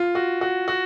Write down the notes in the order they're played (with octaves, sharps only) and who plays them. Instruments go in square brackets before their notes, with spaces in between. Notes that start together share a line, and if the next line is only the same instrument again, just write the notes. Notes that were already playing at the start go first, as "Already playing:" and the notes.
Already playing: [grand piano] F4
[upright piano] F#4
F#4
F#4